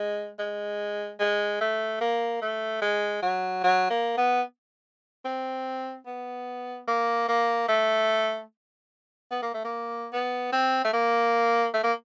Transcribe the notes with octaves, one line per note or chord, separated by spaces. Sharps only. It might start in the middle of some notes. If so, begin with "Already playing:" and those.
Already playing: G#3
G#3
G#3
A3
A#3
A3
G#3
F#3
F#3
A#3
B3
C4
B3
A#3
A#3
A3
B3
A#3
A3
A#3
B3
C4
A3
A#3
A3
A#3